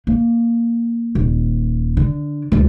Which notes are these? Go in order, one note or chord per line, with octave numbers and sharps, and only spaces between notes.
A#3
D#1
D3
D2 G3